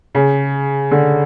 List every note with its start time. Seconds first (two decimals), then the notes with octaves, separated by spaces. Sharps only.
0.15 C#3
0.91 D3